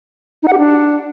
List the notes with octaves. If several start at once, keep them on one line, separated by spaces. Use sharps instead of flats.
D#4
F#5
G4
D4